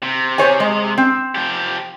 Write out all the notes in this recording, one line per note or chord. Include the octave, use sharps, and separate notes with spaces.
C3
C5 C#5 G#5
G#3
C4
F3 G4